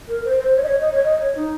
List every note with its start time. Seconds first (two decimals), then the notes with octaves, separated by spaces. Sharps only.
0.08 A#4
0.24 C5
0.39 C5
0.56 C#5
0.63 D#5
0.68 C#5
0.80 D#5
0.92 C#5
1.04 D#5
1.20 C#5
1.36 D#4